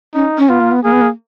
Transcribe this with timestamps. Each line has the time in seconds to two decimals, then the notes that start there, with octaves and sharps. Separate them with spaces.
0.14 C#4 D#4
0.38 C#4
0.49 B3 F4
0.60 A#3
0.71 B3
0.84 A#3 G#4
0.92 B3
1.01 A#3